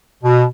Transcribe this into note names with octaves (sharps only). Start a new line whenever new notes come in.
B2